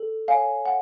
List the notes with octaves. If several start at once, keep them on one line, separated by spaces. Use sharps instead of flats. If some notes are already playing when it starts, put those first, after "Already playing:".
Already playing: A4
C#5 F5 G#5
F#5